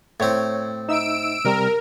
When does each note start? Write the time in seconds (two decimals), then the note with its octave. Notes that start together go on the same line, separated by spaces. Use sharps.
0.20 A2 C4 C#5 G#6
0.89 D#4 E5 E6 D7
1.45 C3 G3 C4 A#4